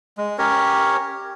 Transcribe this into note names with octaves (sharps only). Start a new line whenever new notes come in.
G#3
C#4 G4 A#4 C#5